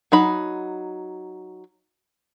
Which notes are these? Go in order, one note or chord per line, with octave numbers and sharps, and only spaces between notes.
F#3 D#4 B5